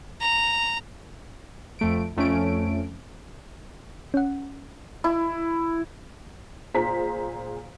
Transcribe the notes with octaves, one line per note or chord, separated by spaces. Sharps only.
A#5
F2 A3 D7
F2 A3 C#4 D7
C#4 F#5
E4
A#2 G#4 C5 A#5 B6